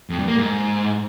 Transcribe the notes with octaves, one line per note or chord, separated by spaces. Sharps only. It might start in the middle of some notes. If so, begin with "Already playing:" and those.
F2
G2
A#3
G#2